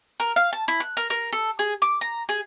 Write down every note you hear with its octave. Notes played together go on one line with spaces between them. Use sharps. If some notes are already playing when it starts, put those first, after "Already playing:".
A#4
F5
A5
E4
F#6
A#4
A#4
A4
G#4
D6
A#5
G#4